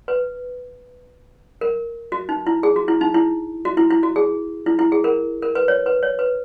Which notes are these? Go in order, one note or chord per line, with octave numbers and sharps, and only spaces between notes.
B4
A#4
F#4
D#4
E4
G#4
F#4
E4
D#4
E4
F#4
E4
E4
F#4
G#4
E4
E4
G#4
A#4
A#4
B4
C#5
B4
C#5
B4